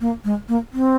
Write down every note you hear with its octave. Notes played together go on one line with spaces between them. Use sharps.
A#3
G#3
A#3
C4